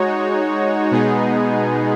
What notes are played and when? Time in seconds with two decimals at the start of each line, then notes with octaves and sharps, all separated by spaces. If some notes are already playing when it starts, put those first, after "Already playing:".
Already playing: G#3 D#4 F#4 C#5
0.91 B2 G#3 B3 D#4 G#4